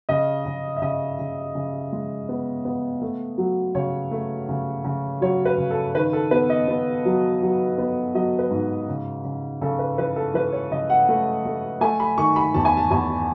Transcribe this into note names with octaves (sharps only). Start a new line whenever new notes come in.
C#3 D#5
C#3
E5
C#3 D#5
C#3
C#3
G#3
B3
B3
A3
F#3
C#3 C#5
A3
C#3
C#3
F#3 C#5
B4
C#3
A4
D#3 B4
A4
B3 B4
D#5
B3
F#3
F#3
B3
F#3 D#5
B4
G#2
C#3
C#3
C#3 A4
B4
E3 B4
A4
E3 B4
C#5
C#3 D#5
F#5
A3
A3
A3 G#5
B5
D#3 C#6
B5
E2 A5
G#5
A5
E2 G#5